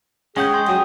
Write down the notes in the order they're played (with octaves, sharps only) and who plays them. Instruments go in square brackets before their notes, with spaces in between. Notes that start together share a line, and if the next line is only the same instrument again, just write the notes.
[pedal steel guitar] G#3 F#5 G6 [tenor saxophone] C#4 [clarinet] G#4 [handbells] G5
[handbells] C6
[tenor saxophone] F#3 [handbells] G5 [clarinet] D#6